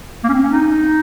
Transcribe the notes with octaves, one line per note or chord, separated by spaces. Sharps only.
A#3
C#4
C4
C#4
D#4